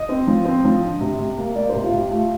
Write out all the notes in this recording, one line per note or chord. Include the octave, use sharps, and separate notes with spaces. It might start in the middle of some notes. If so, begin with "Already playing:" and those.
Already playing: D#5
C4
F3
C4
F3
D3
C3
C3
A#3
A#3 D5
C5
C3
F4
C3 G4
A3 F4